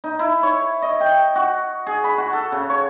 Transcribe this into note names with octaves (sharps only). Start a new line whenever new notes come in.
D#4
E4
C#5
D#5
G5
F#4
G#4
B5
F#4
A4
C#3
C#5